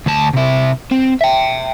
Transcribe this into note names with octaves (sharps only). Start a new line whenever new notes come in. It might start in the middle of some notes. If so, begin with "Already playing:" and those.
D2 A5
C3 E4
C4
E5 G5